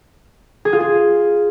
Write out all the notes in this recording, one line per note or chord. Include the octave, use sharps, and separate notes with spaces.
G#4
F4
G#4